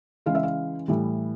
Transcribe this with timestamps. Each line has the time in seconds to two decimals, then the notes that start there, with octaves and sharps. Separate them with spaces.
0.26 C#3 E3 G#3 F5
0.35 E5
0.43 F5
0.88 A2 E3 G3